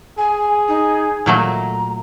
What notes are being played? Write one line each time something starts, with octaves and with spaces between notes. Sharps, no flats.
G#4 G#5
D#4
A#2 F#3 A3 A#5